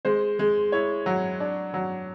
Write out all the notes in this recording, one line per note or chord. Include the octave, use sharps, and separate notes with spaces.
G#3 C5
G#3
E4 C#5
F#3
D4
F#3